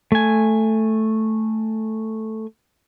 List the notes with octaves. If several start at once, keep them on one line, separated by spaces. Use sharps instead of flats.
A3 G#5